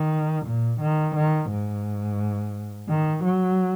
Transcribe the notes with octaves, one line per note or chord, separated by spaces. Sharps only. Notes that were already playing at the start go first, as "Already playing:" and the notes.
Already playing: D#3
A#2
D#3
D#3
G#2
D#3
F#3